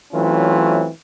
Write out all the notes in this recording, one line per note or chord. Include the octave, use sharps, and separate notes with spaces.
E3 F#3 A3 C4 C#4 F4